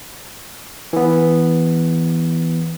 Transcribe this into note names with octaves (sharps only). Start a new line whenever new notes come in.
E3 B3